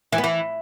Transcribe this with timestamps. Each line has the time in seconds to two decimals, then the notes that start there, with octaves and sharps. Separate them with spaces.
0.12 E3
0.18 B3
0.24 E3